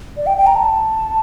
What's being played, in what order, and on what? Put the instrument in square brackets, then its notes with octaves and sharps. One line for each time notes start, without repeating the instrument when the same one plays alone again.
[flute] D5
G5
G5
A#5
A5